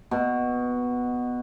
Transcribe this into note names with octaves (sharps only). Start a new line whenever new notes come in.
B2